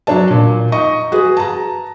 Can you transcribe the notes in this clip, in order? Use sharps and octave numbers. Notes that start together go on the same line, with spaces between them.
F#3 D4 C#5 A5
A#2
D#4 D#5 C#6
F#4 G#4 B4
A5 A#5